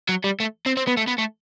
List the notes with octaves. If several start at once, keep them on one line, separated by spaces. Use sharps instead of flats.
F#3
G3
A3
C4
C4
B3
A3
B3
A3